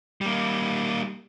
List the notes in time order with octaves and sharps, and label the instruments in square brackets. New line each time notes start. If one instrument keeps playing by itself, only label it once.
[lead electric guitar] G3 A#3